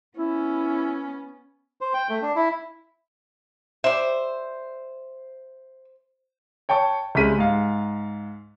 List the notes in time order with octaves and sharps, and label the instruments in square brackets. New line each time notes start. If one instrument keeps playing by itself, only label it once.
[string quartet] B3 C#4 [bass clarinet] E4
[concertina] C5
G5
A3
D4
E4
[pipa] G3 E5 [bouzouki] C5
[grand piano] C#5 G5 A5 C#6
C2 C#3 G#3 B6 D#7
G#2 F5